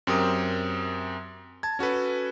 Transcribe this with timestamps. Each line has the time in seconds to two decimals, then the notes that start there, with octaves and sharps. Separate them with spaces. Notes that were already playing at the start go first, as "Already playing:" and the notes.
0.07 F#2 C4 G4 A#4 D#6
1.63 A5 G#6
1.79 C#4 F#4 A4 B4